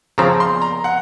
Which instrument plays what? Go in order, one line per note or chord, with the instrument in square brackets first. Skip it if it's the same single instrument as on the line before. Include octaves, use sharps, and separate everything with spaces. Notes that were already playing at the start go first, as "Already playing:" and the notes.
[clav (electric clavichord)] C#3 F3 C4 [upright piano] A#5
[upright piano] C6
A#5
F#5